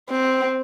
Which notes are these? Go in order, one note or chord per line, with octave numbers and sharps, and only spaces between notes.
C4